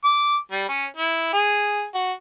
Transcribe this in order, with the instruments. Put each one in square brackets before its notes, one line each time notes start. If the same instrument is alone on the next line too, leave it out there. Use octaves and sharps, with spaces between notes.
[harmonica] D6
G3
C#4
E4
G#4
F#4